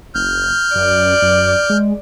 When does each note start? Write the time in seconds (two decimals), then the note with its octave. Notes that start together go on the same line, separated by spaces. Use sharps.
0.15 F#1 F6 G6
0.76 F#2 D5
1.22 F#2
1.70 G#3